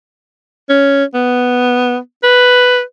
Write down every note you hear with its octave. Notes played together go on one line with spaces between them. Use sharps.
C#4
B3
B4